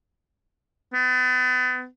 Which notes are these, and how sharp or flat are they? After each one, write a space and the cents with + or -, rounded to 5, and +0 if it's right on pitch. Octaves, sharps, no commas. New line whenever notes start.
B3 +35